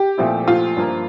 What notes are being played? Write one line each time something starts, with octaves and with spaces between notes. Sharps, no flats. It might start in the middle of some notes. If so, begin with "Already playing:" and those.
Already playing: G4
A#2 F3 A3 C4 E4
F4
G2 F3 A#3